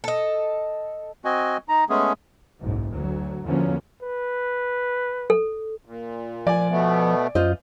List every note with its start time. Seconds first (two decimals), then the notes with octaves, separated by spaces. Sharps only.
0.04 A4 D#5
1.25 C4 F#4 D#5 G#5
1.69 D#4 A#5
1.89 G#3 A3 B3 C#4 G#4
2.59 F#1 B1 G#2
2.92 D2 F#3
3.46 E2 D3 F3 F#3 A#3 C#4
4.02 B4
5.30 A4
5.86 A#2
6.47 F3 D5 G#5
6.70 B2 A3 B3
7.35 F#2 F4 C5 D#5